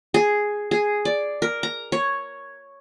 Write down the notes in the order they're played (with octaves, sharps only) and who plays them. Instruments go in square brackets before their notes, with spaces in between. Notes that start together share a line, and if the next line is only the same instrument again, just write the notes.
[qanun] G#4
G#4
D5
A#4
A#5
C#5